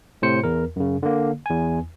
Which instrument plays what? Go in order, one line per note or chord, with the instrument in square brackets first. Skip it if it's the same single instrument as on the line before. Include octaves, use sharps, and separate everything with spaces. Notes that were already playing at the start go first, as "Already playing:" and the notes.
[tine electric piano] A2 C3 C5 C#7
E2 A#4
F#2 C#3
D3 A#3
E2 G#5